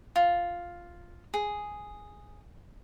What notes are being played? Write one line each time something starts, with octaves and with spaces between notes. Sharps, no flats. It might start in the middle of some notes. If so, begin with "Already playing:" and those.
F4
G#4